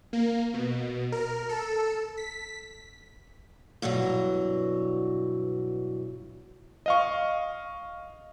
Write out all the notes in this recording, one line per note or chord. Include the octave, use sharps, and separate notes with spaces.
A#3
B2
A#4
A4
B6
G2 B2 E3 F#3
D#5 F5 C#6